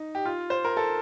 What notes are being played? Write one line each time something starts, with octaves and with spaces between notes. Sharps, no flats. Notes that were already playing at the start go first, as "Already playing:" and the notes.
Already playing: D#4
G4
F4
C5
A#4
A4